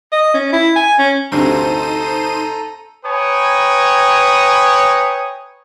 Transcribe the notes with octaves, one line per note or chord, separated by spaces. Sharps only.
D#5
C#4
E4
G#5
C#4
D2 G2 C3 D#4 A4 C5 A#5 D#7
B4 C#5 G5 G#5 A#5 D#6